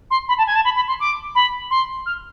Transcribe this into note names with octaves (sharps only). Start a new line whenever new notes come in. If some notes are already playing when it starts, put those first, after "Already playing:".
C6
B5
A5
G#5
A5
B5
B5
C6
D6
B5
C6
F6